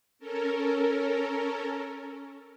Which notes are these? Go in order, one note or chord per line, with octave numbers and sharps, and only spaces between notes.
C#4 A4 A#4